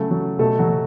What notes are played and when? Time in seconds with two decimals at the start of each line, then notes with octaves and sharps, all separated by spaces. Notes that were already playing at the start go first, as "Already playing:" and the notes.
Already playing: C#3 F#3 A3 A4
0.11 F#3
0.39 B2 A3 A4
0.58 F#3 F#4
0.69 F#3